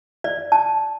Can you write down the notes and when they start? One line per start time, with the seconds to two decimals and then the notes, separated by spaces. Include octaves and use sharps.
0.24 D5
0.52 A5